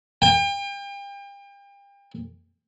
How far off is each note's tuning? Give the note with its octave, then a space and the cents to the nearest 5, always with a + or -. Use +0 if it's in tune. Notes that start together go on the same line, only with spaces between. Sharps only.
G5 +35